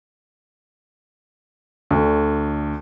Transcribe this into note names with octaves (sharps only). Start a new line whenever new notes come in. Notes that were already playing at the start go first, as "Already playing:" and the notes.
D2 D3